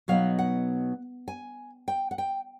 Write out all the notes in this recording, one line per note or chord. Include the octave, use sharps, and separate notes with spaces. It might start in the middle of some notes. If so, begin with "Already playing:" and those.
B2 F#3 B3 D#4 F5
F#5
G#5
G5
F#5
G5